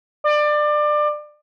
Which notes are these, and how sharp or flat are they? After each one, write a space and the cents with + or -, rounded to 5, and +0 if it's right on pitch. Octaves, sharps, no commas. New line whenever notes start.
D5 +25